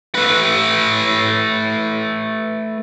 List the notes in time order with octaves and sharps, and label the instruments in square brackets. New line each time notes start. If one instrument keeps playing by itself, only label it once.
[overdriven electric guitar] A3 B4